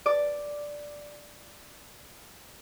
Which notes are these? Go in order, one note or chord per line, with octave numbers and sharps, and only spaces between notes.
D5 D6